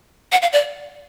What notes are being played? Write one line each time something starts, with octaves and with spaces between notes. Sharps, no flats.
F#5
F5
D5